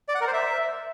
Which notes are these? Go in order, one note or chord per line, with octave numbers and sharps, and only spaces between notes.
D5
F#5
A#4
C5
E5